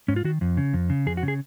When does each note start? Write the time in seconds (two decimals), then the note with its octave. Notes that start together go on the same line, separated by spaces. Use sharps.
0.08 G#2 C#4
0.16 F4
0.24 D#3 F#4
0.41 F2
0.57 C#3
0.73 F2
0.90 C#3
1.06 F2 G#4
1.17 F#4
1.23 C#3
1.28 G#4